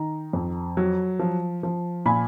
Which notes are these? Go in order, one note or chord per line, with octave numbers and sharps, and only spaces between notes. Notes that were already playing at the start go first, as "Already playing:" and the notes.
Already playing: D#3 A#5
F2
F#3
F3
F3
A#2 G#5 B5